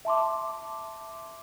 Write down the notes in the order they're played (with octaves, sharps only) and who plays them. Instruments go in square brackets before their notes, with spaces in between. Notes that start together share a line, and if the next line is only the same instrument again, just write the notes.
[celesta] E5 A5 C6 D6